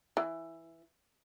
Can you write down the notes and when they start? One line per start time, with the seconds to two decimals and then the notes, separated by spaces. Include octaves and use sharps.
0.17 E3